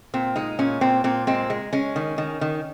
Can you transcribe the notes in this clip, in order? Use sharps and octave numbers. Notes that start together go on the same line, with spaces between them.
A#2 C4
G#3 D#4
A#2 C#4
A#2 C4
A#2 C4
G#3 C4
G#3
G#3 C#4
D#3
D#3
D#3